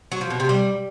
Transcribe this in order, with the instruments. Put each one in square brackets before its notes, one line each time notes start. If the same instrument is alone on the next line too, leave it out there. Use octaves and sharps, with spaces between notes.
[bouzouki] F#3
F3
B2
C3
G3